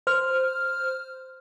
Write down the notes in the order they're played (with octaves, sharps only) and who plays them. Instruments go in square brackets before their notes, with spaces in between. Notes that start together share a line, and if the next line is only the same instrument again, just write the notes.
[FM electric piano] C5 F6